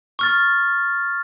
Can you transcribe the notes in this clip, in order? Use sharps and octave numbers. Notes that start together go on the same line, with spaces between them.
C#6 F6 A6